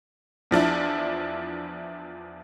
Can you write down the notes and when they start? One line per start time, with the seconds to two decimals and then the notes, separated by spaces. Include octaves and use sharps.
0.51 E2 F3 D4 E4